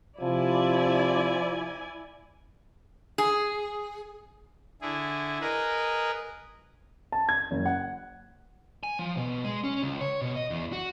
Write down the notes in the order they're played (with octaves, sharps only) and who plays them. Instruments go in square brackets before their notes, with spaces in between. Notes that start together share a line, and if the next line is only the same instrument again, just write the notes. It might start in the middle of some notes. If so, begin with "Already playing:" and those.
[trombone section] C3 [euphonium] F3 [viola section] E4 D5 G#5
[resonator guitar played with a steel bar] G#4
[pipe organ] D3 E4 G#4
G#4 A#4 B4 D#5
[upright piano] A5
G#6
F#1
F#5
[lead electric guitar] G#5
F3
B2
G#3
C#4
C#2
C#5
B2
D#5
E2
F#4